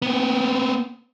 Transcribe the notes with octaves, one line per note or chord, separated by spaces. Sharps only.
B3 C4